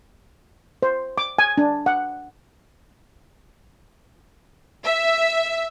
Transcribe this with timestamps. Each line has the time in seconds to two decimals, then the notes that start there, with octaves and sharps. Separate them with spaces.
0.82 C5
1.18 D6
1.39 G#5
1.58 D4
1.86 F#5
4.84 E5